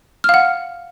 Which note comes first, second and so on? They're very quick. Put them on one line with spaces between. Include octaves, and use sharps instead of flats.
F6 F5 F#5